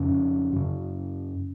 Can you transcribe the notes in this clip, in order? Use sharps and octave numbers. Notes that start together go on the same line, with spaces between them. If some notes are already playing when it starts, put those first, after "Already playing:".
Already playing: F2 C#3 C#4
F#2 C#3